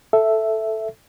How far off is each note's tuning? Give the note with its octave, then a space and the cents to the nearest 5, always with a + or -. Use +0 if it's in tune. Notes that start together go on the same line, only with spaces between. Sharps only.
A4 +0 E5 +0